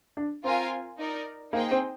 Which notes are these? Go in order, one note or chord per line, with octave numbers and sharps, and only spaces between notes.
D4
C4 F4 A#4 F5 G#5
D#4 A#4 D5
A#3 D#4 G#4 C5 G5
C4